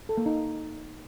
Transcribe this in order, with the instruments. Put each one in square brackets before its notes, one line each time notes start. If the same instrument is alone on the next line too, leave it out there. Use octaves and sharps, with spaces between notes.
[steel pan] A4
A#3
D#4